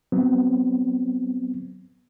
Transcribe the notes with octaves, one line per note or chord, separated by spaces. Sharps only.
F#3 B3 C4